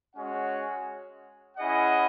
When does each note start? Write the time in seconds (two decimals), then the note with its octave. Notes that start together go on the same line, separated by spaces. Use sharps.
0.15 G#3 C#4 F#4 C#5 F#5
1.57 C#4 E4 G#4 D#5 F#5